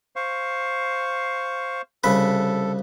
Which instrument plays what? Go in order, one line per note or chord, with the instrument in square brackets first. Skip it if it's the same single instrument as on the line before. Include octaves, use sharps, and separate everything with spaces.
[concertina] C5 F5 C#6
[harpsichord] C2 C#3 B4 [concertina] A4